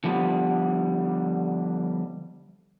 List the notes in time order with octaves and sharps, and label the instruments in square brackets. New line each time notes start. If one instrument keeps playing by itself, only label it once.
[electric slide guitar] D3 F3 G3 B3